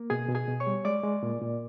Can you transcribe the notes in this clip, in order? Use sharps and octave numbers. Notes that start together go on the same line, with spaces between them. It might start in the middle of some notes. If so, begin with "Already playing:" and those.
Already playing: A#3
B2 G#4 G#5
B2
G#4 G#5
B2
C#5 C#6
G3
G#3 D5 D6
G#3
A#2
A#2